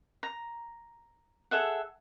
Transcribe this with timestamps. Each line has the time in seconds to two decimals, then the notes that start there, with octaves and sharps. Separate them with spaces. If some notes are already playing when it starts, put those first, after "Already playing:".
0.23 A#5
1.51 G#4 A4 E5 F#5